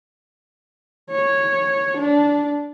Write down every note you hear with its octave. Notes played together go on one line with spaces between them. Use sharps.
C#5
D4